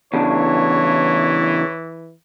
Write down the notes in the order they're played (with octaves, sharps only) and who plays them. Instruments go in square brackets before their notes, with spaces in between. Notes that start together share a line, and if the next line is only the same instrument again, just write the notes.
[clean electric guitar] E2 C#3 D4 [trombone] E3 [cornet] C#5